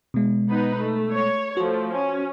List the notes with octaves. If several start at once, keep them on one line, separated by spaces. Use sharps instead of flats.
B2 G#3
B3 D#4 B4
A3
C#5
F3 A3 F#4
C#4